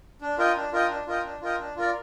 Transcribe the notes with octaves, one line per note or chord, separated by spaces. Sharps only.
D4
F4 A#4 D#5 G5
D4
F4 A#4 D#5 G5
D4
F4 A#4 D#5 G5
D4
F4 A#4 D#5 G5
D4
F4 A#4 D5